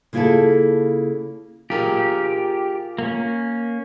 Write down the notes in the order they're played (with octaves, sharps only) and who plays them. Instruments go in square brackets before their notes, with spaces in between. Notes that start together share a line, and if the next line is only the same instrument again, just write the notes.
[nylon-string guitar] C#3 A#3 E4 F4 G#4 A4
[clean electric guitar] F4 G#4 A#4 [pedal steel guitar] G4
[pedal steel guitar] A#3 C#4